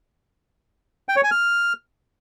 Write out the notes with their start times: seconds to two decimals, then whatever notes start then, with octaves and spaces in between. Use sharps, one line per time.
1.09 G5
1.16 C#5
1.24 G#5
1.31 F6